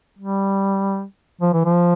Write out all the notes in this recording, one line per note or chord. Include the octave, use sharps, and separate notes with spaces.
G3
F3
E3
F3